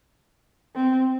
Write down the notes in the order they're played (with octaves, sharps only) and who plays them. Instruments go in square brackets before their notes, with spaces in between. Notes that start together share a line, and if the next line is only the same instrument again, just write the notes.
[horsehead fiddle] C4